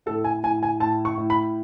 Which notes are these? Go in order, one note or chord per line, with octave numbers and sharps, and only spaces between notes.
A2 A4
G#5
A2 G#5
G#5
A2 A5
C#6
A2
B5